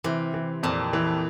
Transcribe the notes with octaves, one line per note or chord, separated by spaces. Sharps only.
C3 E3
E3
F2 A#2
E3